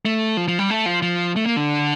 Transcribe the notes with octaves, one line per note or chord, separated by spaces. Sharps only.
A3
F3
F3
G3
A3
F3
F3
A3
A#3
D3